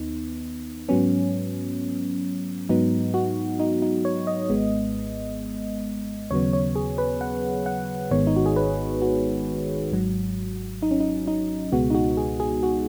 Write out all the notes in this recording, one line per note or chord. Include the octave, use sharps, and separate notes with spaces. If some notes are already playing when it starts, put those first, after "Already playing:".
Already playing: D#2 B3 D#4
G#2 F#3 B3 C#4
G#2 F#3 B3 D#4
F#4
D#4
D#4
C#5
D#5
G#1 G#2 G#3 B3
D#2 C#3 F#3 B3 C#5
C#5
G#4
B4
F#5
F#5
G#1 G#2 D#3 G#3 B3 C#5
D#4
F#4
G#4
B4
F#4
G#1 G#2 F#3
D#4
C#4
D#4
D#4
C#2 B2 G#3 B3 F#4
D#4
F#4
G#4
G#4
F#4